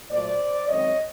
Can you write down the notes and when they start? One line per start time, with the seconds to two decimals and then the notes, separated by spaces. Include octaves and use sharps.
0.10 A#2 F#3 A3 C5 D5
0.68 F#2 D#3 G#3 C4 C#5 D#5